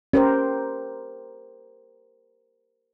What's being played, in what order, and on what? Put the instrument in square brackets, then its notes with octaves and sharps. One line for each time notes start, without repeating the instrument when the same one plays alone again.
[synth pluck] C#4 [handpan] G4 A#4 C5